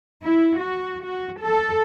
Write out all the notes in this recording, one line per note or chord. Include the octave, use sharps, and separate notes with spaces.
E4
F#4
F#4
A4